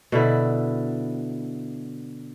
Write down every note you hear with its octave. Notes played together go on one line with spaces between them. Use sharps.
B2 D3 E4